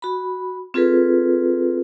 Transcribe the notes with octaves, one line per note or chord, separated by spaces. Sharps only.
F#4 B5
C4 F4 G#4 A4 B4